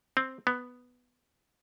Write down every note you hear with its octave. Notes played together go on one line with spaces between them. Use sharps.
C4
B3